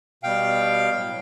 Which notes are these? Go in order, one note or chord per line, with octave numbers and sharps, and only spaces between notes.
B2 G3 F5 G5
A2 F#3